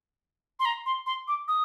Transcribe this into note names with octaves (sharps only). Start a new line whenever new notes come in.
C6
A#5
C6
C6
D6
D#6